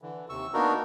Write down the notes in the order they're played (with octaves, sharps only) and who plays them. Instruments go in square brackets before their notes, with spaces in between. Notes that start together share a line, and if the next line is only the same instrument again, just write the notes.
[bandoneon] D3 E3
D#2 C3 C#6 E6
A#3 B3 D4 D#4 F#4 A#4